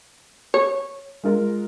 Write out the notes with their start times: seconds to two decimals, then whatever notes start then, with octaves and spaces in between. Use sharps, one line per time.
0.54 C#5
1.24 G#3 F4 A#4